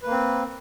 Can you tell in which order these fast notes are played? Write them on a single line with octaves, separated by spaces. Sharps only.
B4 A#3 C4